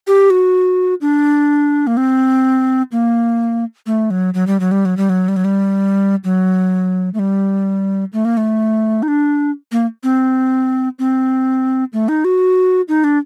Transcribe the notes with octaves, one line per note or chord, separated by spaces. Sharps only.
G4
F#4
D4
A#3
C4
A#3
A3
F#3
F#3
G3
F#3
G3
F#3
G3
F#3
G3
F#3
G3
F#3
A3
G3
A3
A#3
A3
D#4
D4
A#3
C4
C4
A3
D#4
F#4
D#4
D4